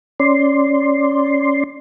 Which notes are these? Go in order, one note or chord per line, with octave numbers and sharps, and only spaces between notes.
C#4 D5 C6